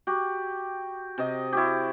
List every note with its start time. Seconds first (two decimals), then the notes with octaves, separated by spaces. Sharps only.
0.07 F#4 G4
1.18 C3 D#5
1.52 E4 F#4 G4